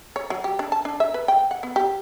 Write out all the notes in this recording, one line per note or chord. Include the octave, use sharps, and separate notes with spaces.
C#5
F#3
G4
D4
A5
D4
E5
B4
G5
F#5
B3
G4